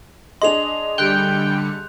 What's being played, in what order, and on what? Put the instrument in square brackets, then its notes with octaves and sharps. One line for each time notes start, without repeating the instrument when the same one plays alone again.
[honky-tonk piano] D4 G#4 D#5 [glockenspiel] C6 F7
[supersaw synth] D3 G3 C#7 [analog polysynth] G5 [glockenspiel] F#6 G6